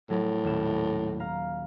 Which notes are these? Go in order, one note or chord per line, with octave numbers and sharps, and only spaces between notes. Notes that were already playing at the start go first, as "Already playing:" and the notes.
A2 F#3
D#1 E7
F5 A#5